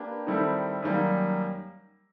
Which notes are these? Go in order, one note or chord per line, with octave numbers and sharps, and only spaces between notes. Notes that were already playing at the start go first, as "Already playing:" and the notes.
Already playing: A#3 D4 G4 B4
D#3 G3 C4 E4 A4
F#2 D#3 G3 A#3